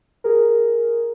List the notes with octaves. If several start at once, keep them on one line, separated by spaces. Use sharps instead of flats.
G#4 A#4